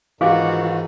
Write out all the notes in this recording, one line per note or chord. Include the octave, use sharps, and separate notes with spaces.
G#2 D#3 E3 F4 F#4 G#4 F5 D6